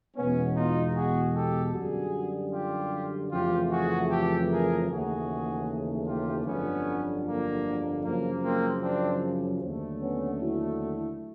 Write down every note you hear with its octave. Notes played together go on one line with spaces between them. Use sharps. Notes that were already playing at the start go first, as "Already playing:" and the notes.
E2 B2 G#3 B3 C#4
D#4 F4
F#4 G#4
G4 A4
F#2 D3 G3 F#4 G#4
F4 G4
F2 C#3 E3 A3 F4 G4
F#4 G#4
G4 A4
G#4 A#4
D#2 C#3 E3 A3 F#4 G#4
F4 G4
G1 F2 D3 F#3 B3 C#4
A#3
F#2 C#3 F3 A#3
A#3 C4
C4 D4
D#2 D3 F#3 A3
B3 C#4
E4 F#4